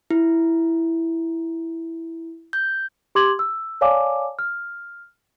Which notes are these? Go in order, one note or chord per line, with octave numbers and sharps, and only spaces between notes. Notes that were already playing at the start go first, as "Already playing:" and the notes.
E4
G6
G4 C6 D6 G#6 F#7
E6
C#5 D5 F5 G#5 A5 D6
F6